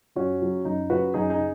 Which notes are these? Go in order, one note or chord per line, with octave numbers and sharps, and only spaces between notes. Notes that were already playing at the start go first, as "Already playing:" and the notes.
F#2 C#4 F#4
C#3 F#3
F#2 D#4
C#3 F#3 F#4 B4
F#2 D#4 G#4
D#4 G#4
C#3